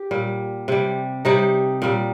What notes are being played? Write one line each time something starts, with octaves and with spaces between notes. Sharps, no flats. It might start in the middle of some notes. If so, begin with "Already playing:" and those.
Already playing: G4
A#2 G3
C3 G3
C3 G3 D#4
A#2 G3